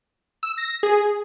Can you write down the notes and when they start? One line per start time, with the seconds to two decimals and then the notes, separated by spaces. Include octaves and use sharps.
0.43 E6
0.58 A#6
0.83 G#4